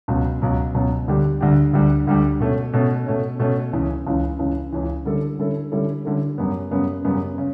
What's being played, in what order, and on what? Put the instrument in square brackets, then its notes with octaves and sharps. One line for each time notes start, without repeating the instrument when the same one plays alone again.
[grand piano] C#2 B2 F#3
C#2 B2 F#3
C#2 B2 F#3
D2 D3 G3 D4 G4
D2 D3 G3 D4 G4
D2 D3 G3 D4 G4
D2 D3 G3 D4 G4
B2 A3 C#4
B2 A3 C#4
B2 A3 C#4
B2 A3 C#4
C#2 C#3 E3
C#2 C#3 E3
C#2 C#3 E3
C#2 C#3 E3
D3 G3 C#4 E4 A4
D3 G3 C#4 E4 A4
D3 G3 C#4 E4 A4
D3 G3 C#4 E4 A4
F#2 C#3 G3 B3
F#2 C#3 G3 B3
F#2 C#3 G3 B3
C#3